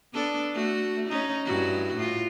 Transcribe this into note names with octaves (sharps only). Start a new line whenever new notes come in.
B3 D4 A4
A3 F#4
C#4 D#4
G2 E4 F#4
A2 F4